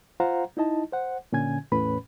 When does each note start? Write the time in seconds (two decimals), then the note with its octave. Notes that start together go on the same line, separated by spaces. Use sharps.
0.20 F4 C5 F5 F#5 A#5
0.57 D#4 E4 D#5 A5
0.93 C5 F#5
1.32 A#2 D3 C#4 G#5 G#6
1.72 E2 A2 C#4 B4 B5